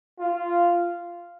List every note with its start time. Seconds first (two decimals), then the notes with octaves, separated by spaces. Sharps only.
0.19 F4